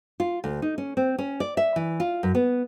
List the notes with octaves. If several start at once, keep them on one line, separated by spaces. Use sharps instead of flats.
F4
D2
D#4
C#4
C4
C#4
D5
E5
E3
F4
F#2
B3